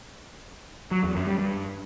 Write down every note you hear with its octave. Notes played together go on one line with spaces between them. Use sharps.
F#3
E2
F#2
G3
G2